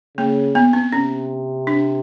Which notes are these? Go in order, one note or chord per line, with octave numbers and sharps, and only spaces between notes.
C#3 A#3
B3
C4
C3 C#4
D4